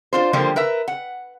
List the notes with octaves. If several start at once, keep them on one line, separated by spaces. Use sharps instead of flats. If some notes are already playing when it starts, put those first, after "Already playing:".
D4 F4 C5
D3 F3 G3 A#3 G4 C5
A#4 B4 E5
F#5